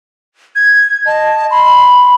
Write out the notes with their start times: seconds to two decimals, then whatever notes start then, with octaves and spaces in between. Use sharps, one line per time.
0.55 G#6
1.06 D#5 A5
1.51 B5 C6